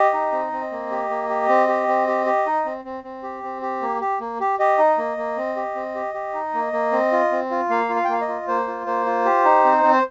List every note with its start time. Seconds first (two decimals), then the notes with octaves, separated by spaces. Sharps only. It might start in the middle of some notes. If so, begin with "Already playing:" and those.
Already playing: G4 D#5
0.13 D#4
0.32 C4
0.52 C4
0.72 A#3
0.91 G4
1.09 A#3
1.29 G4
1.49 C4
1.68 G4
1.88 C4
2.08 G4
2.26 G4
2.46 D#4
2.65 C4
2.85 C4
3.04 C4
3.23 G4
3.43 C4
3.62 G4
3.82 A#3
4.01 G4
4.20 A#3
4.40 G4
4.59 G4 D#5
4.78 D#4
4.98 A#3
5.17 A#3
5.37 C4
5.56 G4
5.75 C4
5.95 G4
6.14 G4
6.34 D#4
6.54 A#3
6.73 A#3
6.92 C4
7.12 F4
7.32 C4
7.51 F4
7.69 A#3 F5
7.89 F4
7.96 F5
8.05 G5
8.09 A#3 F5
8.21 D#5
8.28 F4
8.48 A#3 C5
8.67 F4
8.86 A#3 C5
9.06 F4
9.25 G4
9.44 D#4
9.64 C4
9.84 C4
9.93 C5